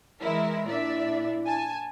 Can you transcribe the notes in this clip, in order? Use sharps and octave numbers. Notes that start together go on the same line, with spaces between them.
E3 G#3 E4 A#4 E5
A#2 D4 E4 D5 E5
G#5 A5